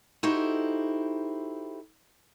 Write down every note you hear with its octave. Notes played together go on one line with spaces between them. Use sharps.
D#4 E4 F#4 G4 A4 C5